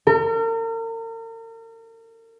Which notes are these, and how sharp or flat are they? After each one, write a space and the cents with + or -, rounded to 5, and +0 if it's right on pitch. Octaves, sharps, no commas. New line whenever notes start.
A#4 -40